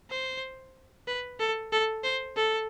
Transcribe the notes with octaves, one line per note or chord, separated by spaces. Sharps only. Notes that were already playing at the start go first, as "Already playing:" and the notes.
C5
B4
A4
A4
C5
A4